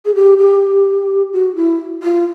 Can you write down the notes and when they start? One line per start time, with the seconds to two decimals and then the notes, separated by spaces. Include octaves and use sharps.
0.06 G#4
0.15 G4
0.38 G4
1.33 F#4
1.56 E4
2.03 F4